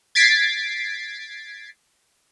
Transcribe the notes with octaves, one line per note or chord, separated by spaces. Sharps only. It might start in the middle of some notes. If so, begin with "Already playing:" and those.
G#6 A6 B6 C7 D7